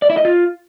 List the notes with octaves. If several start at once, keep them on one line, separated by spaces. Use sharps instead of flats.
D5
E4
D#5
F4